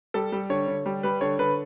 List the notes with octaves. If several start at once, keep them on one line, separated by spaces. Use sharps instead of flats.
G3 A4
G3
D3 C#5
D3
G3
G3 B4
D3 C#5
D3 B4